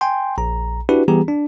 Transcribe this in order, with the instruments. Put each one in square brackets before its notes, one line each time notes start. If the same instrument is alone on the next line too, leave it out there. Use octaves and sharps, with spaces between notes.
[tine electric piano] G5 G#5 C6
A#1 A#5
D4 E4 F#4 G4 B4
E3 G3 B3 G4 G#4 A#5
D4